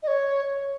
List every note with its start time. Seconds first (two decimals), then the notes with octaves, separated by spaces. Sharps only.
0.03 D#5
0.07 C#5